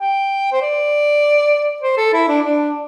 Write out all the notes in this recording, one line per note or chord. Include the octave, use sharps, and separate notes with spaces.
G5
C5
D5
C5
A4
E4
D4
D4